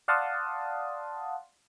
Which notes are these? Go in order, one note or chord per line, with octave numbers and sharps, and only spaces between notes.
D5 F5 F#5 A5 C6 D#6